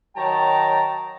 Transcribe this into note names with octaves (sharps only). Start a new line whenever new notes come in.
D#3 F#3 C#5 G5 A5 A#5